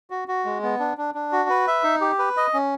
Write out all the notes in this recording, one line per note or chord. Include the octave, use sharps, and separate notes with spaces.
F#4
F#4
G#3
B3
D4
D4
D4
F#4
B4
E5
D#4
G4
B4
D#5
C#4